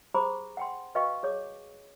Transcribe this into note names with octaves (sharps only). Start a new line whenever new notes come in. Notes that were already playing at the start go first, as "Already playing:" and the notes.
G4 G#4 C5 A#5 B5 D6
F#5 G5 C6
F#4 B4 D#5 F5 G5 C#6
G#4 C#5 D6